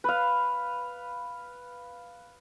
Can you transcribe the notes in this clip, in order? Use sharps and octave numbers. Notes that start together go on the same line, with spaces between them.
B4 F5